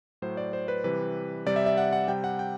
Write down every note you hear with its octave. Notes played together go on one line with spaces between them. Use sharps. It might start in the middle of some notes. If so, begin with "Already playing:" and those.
A2 F#3 C5
D5
C5
B4
C3 E3 G3 B4
C3 G3 D5
E5
E5
F#5
F#5
C3 G3 G5
F#5
G5